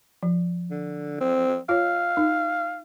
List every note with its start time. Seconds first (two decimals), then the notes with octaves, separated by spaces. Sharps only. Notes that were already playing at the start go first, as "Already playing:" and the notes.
0.23 F3
0.71 D3
1.21 C4
1.69 F4 C#5 F5
2.17 D#4